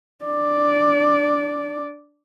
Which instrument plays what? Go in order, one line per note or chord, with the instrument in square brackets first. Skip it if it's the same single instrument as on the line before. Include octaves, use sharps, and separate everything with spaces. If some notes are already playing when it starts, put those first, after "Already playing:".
[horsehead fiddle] D4 D5